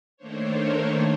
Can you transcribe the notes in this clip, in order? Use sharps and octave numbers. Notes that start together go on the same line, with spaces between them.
D#3 A3 A#3 D4 C5 C#5